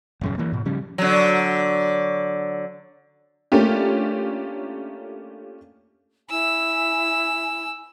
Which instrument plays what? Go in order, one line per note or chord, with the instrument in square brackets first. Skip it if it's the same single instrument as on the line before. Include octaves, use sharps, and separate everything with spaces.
[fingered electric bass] D#1 F#2 C#3
E3 A#3
G#2 B2
C#3 F3 G3 C#4
[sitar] D3 F#3
[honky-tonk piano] A3 A#3 C#4 D4 F4 G4
[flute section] E4 G#5 [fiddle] E6